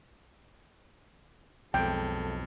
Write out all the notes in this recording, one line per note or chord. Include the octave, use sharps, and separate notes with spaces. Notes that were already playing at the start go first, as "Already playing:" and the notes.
B1 F2 G#3 A4 G5